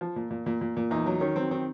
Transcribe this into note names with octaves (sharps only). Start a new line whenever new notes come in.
F3
A#2
A#2
A#2
A#2
A#2
E2 D#4
F#3
D#3 C#4
F#3 C4
D#3 C4